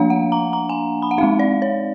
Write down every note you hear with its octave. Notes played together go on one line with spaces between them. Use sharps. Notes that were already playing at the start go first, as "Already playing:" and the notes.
Already playing: F3 A#3 D4 F5
F#5
A#5
A#5
G#5
B5
F#5
G#3 C4 D#4 F5
D5
C#5